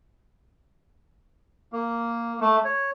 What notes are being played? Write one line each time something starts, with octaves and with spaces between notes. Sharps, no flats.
A#3
A3
C#5